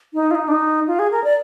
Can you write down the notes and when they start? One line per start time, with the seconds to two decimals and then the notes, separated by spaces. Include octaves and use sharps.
0.14 D#4
0.31 F4
0.35 D#4
0.48 D4
0.52 D#4
0.87 F4
0.99 G#4
1.11 A#4
1.24 D5